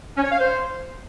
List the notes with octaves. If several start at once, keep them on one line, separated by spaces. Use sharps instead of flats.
C#4
C#5
F5
C5